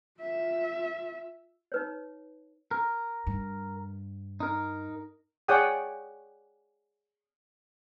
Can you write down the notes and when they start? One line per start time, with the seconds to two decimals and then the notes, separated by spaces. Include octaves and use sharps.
0.21 F4 E5
1.72 D#4 B4 C#5
2.71 A#4
3.27 G2
4.40 D#4 A#4
5.48 G#4 C#5 D5 F#5 G5 D#6